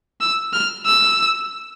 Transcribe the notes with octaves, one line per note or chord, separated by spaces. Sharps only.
E6
F6
E6